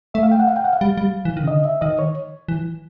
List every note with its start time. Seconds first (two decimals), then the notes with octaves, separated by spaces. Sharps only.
0.14 A3 E5
0.23 F5
0.32 G5
0.39 F#5
0.47 F5
0.56 G5
0.64 F#5
0.73 F5
0.81 G3
0.97 G3
1.25 E3
1.37 D#3
1.43 C#3
1.48 D3 D#5
1.65 E5
1.81 D#3 D#5
1.99 C#5
2.48 E3